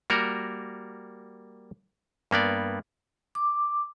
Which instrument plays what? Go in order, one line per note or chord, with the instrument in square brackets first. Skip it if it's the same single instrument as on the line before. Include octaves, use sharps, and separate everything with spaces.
[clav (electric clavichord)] G3 A#3 F#4 A#4
G2 A#3 B3 D5
[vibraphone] D6